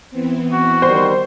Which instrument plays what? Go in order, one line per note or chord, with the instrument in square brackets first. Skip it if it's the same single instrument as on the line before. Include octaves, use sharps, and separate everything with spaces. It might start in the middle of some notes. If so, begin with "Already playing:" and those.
[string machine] E3 B3 C4
[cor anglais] F#4
[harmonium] D#3 G3 [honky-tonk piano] C5